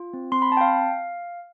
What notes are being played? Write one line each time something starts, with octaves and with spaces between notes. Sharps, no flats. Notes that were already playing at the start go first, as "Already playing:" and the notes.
Already playing: F4
C4
C4 C6
B5
C4 A5
G5
F5